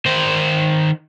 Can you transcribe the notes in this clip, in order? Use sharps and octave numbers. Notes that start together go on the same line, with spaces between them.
D#3 C5